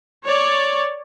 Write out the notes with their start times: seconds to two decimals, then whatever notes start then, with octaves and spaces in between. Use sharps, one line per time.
0.24 C#5 D5